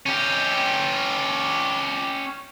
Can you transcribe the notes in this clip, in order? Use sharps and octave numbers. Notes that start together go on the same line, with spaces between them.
C#4 G4